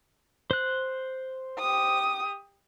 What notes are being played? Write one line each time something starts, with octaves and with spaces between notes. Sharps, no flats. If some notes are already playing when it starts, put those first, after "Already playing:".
C5 F#6
G4 D#6